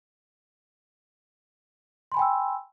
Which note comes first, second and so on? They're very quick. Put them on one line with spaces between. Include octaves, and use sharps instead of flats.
C6 B5 G#5 G5 E6